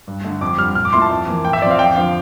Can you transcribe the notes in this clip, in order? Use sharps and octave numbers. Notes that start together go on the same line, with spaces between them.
G2
D3 A3
F2 D6
D3 G3 F6
A#1 F6
D6
A#2 A3 E4 C6
A5
F2
E3 A#3
A2 G5
E5
F3 C4 D5 F5
F2 G5
D3 F3 F5